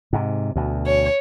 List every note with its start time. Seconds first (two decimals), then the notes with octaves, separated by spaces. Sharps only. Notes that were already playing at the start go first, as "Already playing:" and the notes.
0.13 G#2 C3
0.56 D2 B2
0.86 C#5